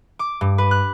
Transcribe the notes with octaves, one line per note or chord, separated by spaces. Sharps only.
D6
G2
B4
F#6